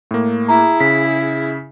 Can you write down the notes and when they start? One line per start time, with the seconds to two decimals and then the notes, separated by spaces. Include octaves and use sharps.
0.11 A2 A#3
0.48 E4 G#4 A#5
0.80 C#3 B6